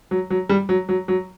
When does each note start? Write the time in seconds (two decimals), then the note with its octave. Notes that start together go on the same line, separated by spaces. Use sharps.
0.11 F#3
0.30 F#3
0.49 G3
0.69 F#3
0.89 F#3
1.08 F#3